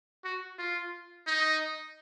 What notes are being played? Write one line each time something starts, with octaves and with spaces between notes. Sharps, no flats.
F#4
F4
D#4